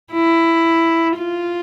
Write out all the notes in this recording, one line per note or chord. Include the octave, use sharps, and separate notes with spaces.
E4
F4